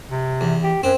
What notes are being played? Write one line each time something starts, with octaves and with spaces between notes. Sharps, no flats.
C3
E2
G4
F#2 C4